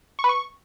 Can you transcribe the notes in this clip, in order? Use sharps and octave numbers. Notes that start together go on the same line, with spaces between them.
C#6
B4
C#6